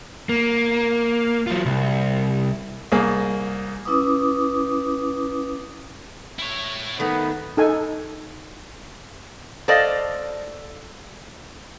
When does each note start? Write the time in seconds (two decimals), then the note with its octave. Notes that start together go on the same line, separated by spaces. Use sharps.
0.29 A#3
1.47 F#3 F4
1.66 C2
2.92 C2 A#3 G#4
3.85 C#4 E4 B4 D6 D#6
6.39 E4 C#5
7.00 D#3 A3 B3 B4
7.57 D#4 A4 G#5
9.68 A4 C5 D5 D#5 F5